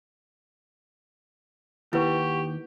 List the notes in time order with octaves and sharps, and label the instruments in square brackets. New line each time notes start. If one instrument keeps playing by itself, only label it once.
[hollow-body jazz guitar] D#2 [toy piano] E4 B4 [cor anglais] G4 [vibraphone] F#5 C#6